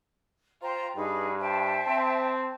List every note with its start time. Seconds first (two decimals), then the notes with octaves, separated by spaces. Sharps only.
0.62 F4 C5 G5 A#5
0.96 G2 D#4 G#4 B4
1.40 C5 E5 G5 A5
1.87 C4